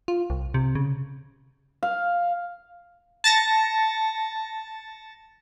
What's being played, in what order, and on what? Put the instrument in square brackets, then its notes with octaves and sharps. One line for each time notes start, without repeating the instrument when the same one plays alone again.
[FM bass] F4
C2
C3
C#3
[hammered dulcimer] F5
[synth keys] A5 A6 A#6 C#7